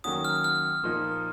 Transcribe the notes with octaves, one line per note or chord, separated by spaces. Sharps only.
D#3 F#3 A#3 C#4 F#4 D#6
F6
F6
A#2 F3 A#3 D#4